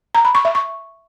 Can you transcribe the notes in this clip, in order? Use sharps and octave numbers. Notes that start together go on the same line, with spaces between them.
A#5
B5
C#6
E5
C#6